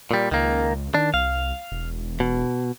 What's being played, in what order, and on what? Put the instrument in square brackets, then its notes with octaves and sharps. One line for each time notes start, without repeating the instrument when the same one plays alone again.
[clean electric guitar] A#2 G3
[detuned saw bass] C#2 [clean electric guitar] D#3 A#3
[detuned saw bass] D#3 [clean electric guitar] D4
[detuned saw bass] C2 [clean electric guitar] F5
[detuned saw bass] E1
[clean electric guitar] B2